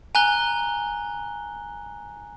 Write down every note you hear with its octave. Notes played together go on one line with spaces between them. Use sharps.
G#5 A#5 F#6 G7